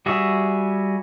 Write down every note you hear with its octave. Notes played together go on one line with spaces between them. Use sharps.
G3 F#4 G#4 E5